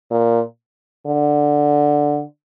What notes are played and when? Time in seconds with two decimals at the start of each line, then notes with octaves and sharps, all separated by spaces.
0.11 A#2
1.06 D3